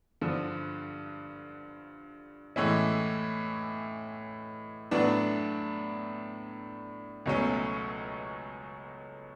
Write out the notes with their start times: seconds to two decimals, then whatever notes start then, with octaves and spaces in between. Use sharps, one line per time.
0.22 G2 D3 F3
2.56 A2 E3 G#3 C#4 E4
4.91 A2 F#3 B3 D4
7.26 C#2 B2 F#3 A3 C#4